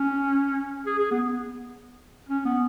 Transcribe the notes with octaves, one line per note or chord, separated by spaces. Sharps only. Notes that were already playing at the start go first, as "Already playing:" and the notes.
Already playing: C#4
G#4
G#4
B3
C#4
B3